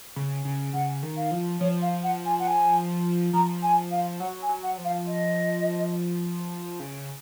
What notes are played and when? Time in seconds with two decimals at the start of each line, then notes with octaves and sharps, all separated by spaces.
0.16 C#3
0.45 C#3
0.74 C#3 F#5
1.03 D#3
1.17 F5
1.31 F3
1.60 F3 C#5
1.82 F5
2.03 F#5
2.25 G#5
2.39 F#5
2.47 G#5
3.34 F3 A#5
3.63 G#5
3.91 F5
4.20 F#3 F#5
4.42 G#5
4.49 F#3
4.63 F#5
4.78 F3
4.85 F5
5.07 D#5
6.80 C#3